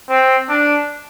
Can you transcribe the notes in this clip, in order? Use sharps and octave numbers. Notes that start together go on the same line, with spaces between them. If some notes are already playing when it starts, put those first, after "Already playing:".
C4
D4